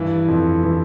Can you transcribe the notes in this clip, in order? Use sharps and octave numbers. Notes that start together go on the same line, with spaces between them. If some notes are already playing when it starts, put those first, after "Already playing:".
Already playing: G2 E3
F2
E3